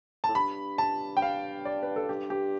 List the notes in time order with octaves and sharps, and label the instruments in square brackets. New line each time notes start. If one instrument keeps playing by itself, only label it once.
[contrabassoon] A2 [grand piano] A5
[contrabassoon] G2 [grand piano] B5
[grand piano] A5
G5
F5
D5
B4
A4
[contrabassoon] G2 [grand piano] G4
[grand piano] G4